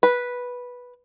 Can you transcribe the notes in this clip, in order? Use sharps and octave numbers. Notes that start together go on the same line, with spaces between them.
B4